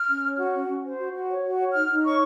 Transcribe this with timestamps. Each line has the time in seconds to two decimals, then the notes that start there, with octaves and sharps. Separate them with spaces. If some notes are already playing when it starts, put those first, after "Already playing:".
Already playing: F6
0.08 C#4
0.23 C#5
0.38 F#4
0.53 C#4
0.68 C#4
0.84 C5
0.99 F#4
1.13 F#4
1.29 C#5
1.44 F#4
1.59 C#5
1.74 D#4 F6
1.89 D#4
2.04 C#5 C#6